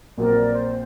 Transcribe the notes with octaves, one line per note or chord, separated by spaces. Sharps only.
A#1 A#2 F#3 C4 A#4 D5
C5